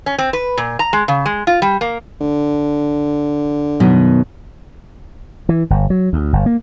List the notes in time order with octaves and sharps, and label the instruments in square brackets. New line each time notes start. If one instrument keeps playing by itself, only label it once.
[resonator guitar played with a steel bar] C#4
C4
B4
A#2
A#5
G#3
C#3
G#3
F4
G3
A#3
[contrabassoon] D3
[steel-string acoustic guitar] F#2 B2 D#3
[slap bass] E3
G1
F#3
D2
G1
A#3